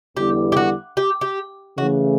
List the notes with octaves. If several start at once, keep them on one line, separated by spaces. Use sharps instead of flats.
E2 D3 G3 B3 E4 G4
G4
F#4
G4
G4
C#3 E3 A3 F#4